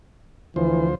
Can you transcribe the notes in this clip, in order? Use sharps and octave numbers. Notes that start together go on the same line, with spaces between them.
D2 E3 F3 C5